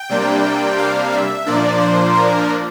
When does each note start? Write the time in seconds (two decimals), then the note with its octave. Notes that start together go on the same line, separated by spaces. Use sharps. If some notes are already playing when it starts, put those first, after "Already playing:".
Already playing: G5
0.09 C3 G3 A#3 D4
0.78 F5
1.12 E5
1.46 A#2 F3 A#3 D4 D5
1.80 C5
2.15 A#4